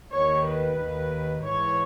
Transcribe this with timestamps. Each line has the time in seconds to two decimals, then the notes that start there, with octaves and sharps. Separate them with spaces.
0.12 D#2 D#3 C#5
0.45 B4
0.79 D#2 D#3
1.44 G#2 E3 C#5